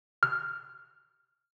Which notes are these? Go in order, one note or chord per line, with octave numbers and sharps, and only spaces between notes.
F6